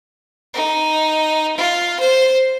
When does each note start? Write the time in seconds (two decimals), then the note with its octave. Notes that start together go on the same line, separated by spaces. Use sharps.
0.54 D#4
1.57 F4
1.99 C5